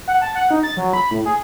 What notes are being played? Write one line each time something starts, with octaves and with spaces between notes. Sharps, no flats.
F#5
A5
F#5
D#4
A6
F#3
B5
A2
G#4